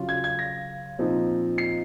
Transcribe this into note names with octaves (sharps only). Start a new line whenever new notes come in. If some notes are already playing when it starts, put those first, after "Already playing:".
Already playing: C#3 F#3 C#4 F4
G#6
G#6
A#6
A#2 F3 C4 D#4
C7